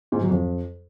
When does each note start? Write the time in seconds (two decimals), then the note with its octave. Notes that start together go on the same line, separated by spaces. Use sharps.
0.12 G#2
0.21 F#3
0.30 F2